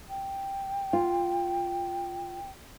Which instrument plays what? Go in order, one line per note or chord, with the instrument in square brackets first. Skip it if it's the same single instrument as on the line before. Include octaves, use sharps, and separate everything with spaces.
[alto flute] G5
[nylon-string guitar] F4